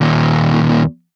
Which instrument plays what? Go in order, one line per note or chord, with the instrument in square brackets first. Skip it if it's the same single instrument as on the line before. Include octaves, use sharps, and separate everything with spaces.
[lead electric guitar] D#2 A#2